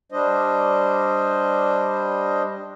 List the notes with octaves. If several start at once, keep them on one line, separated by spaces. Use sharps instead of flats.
G3 D4 C5 D#5